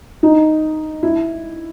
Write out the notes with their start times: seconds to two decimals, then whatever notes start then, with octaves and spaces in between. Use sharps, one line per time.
0.23 D#4
1.03 E4